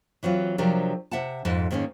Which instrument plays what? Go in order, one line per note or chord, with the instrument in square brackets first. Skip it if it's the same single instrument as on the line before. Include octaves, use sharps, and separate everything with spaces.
[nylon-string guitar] E3 F#3 C4 F4
C3 F3 F#3 D4 G4 A#4
C3 E5 F#5 A5
F2 G#2 A4
G#2 D#3 A#3 C4 C#4